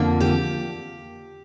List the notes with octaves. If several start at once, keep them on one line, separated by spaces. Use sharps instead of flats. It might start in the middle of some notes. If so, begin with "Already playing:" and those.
Already playing: F2 D3 F3 A#3
G4